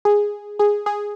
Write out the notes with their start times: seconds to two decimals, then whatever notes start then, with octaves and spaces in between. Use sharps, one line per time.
0.05 G#4
0.59 G#4
0.86 G#4